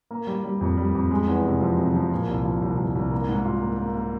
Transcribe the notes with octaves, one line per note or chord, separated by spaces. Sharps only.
A#3
G3
G3
F2
G3
F2
G#3
E2
C3
F3
C3
F3
A#2
C2
F3
C2
C2
C2
A#3
G#2
F4
A#3
A#3
A#3